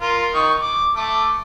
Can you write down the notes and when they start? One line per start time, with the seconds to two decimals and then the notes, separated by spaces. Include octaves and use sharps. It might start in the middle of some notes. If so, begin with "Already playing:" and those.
0.01 F4 A#4
0.34 D#3 C#6
0.62 D6
0.96 A3 A4 D6